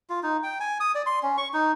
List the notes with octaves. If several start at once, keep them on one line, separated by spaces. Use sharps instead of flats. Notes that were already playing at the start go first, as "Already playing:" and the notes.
F4
D#4
G5
G#5
D#6
D5
C6
C#4
C#6
D#4